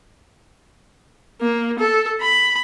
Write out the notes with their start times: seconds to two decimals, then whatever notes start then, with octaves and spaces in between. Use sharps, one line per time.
1.41 A#3
1.79 A4
2.21 B5